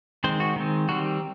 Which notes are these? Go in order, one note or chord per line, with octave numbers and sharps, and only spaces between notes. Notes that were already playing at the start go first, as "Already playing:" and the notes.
D#3 G#3 C4 C5
F#4
D#3 G#3 C4
D#3 G3 C4 F#4